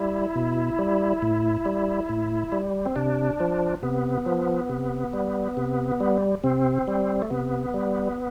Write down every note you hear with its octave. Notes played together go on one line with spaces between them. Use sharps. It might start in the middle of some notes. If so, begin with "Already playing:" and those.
Already playing: G3 E4
B2
G3
A2
G3
A2
G3
C4
C3 D4
F3
C3 B3
F3
C3
G3
C3
G3
C3 C4
G3
A3
C3 B3
G3